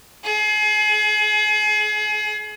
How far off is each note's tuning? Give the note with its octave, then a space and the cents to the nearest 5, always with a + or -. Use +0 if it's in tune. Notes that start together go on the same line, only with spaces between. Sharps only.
G#4 +35